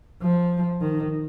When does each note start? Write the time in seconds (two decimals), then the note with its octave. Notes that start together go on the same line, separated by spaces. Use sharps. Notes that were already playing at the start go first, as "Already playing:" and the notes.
0.22 F3
0.81 D#3